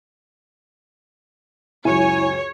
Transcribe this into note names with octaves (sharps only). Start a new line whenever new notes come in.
C#2 F#2 E4 C#5 G#5